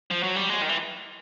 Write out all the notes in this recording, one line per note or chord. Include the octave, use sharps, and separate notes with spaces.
F3
F#3
G3
G#3
D#3
E3